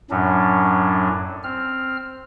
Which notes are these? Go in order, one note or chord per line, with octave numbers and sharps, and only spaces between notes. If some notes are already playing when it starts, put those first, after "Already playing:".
F#2 A2 F#3 C#4 D4
C4 F6